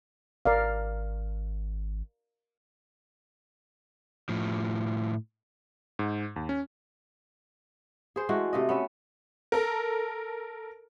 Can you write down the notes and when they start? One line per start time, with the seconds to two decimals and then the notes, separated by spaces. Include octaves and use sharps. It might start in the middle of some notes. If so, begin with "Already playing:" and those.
0.45 G#1 A#4 D5 F5
4.29 A2 F3
5.99 G#2
6.36 D#2
6.49 C#4
8.16 G#4 C5
8.29 E3 G#3 A3 F#4
8.53 C3 A3 D#5
8.69 B3 C#4 E5
9.52 A4 A#4